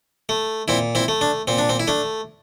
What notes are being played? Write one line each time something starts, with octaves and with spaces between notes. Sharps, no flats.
A3
A#2 C4 E4
C4 E4
A3
D4
A#2 C4
D4
C4
E4
A3 D4